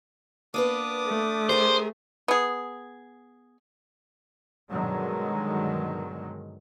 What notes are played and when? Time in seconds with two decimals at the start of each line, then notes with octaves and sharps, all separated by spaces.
0.54 A#3 B3 D4 B4 D6 D#6
1.06 A3
1.49 G4 G#4 A#4 C5
2.28 B3 G#4
4.70 G2 B2 D3 D#3 F#3 G#3